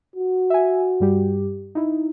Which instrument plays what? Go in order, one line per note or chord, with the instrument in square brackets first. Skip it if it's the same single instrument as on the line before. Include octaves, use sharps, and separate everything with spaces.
[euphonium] F#4
[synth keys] E5 G#5
G2 G3 G4
D#4 E4